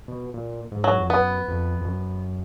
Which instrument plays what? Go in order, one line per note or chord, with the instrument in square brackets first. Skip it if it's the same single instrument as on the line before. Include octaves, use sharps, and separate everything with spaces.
[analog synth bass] B2
A#2
G#2
[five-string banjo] F#3
[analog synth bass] F2
[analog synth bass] F#2 [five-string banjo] B3
[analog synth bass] F2
F2
F#2